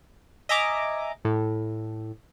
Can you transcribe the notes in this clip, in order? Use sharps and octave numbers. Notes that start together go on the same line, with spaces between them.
D#5 E5 G#5 A#5 D6
A2